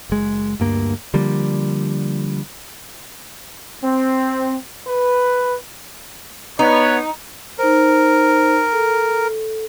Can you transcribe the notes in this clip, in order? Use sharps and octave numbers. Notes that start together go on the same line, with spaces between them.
F#1 G#3
D2 G2 A#3
D3 F3 G3 A#3
C4
B4
B3 D#4 C#5
D#4 A#4 C5
A4